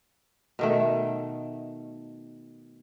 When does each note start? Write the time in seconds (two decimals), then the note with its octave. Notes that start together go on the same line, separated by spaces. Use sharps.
0.59 B2 D#3 A3